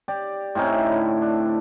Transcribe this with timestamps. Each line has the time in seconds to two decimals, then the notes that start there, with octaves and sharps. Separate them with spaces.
0.08 G4 D5
0.55 A2 C4 C#4 D#4
0.86 D3 E4
1.22 D4